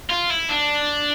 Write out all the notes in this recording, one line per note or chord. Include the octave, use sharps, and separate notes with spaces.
F4
E4
D4